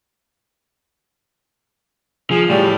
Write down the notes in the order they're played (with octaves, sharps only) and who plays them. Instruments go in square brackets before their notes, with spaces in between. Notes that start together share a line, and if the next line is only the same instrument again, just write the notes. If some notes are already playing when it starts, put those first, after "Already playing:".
[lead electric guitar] F3 [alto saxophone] G#4
[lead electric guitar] A2 [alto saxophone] G3